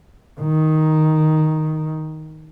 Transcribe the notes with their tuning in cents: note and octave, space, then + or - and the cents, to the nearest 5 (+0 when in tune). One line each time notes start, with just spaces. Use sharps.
D#3 +5